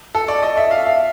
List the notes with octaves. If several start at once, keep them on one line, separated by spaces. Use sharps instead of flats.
A4
D5
D#5
E5
F5
E5